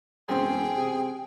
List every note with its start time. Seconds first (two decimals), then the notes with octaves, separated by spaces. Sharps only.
0.29 E1 F#2 C4 G#4 G5
0.76 C3